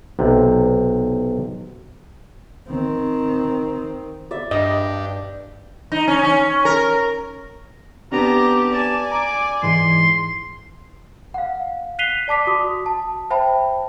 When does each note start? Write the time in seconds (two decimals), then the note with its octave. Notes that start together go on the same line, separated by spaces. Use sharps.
0.19 B1 C3
2.68 D#3 C4
4.31 D5 E5
4.51 G2 D4 G4 D#5
5.92 D#4
6.08 C#4
6.23 C#4
6.65 A#4
8.12 B3 C4 D4 G4 A5 A#5
8.73 D5 G#5 A5
9.12 A#5 D6
9.63 G#2 E3 G#3 C6
11.34 F5 F#5
11.99 F#6 B6 C7 D#7 F7 G7
12.28 D5 A5 D6 B6
12.47 F#4 D#6
12.86 A5
13.30 C5 E5 G5 A5 B5